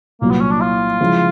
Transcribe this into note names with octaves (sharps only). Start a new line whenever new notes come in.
C2 A#2 F#3 A#3
B3
C#4
D4
F4
C#3 F3 G#3 C#4 E4